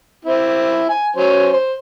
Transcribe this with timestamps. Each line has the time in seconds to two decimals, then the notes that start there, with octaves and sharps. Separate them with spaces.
0.25 C4 E4
0.89 G#5
1.16 F#3 C#4 C5
1.53 C5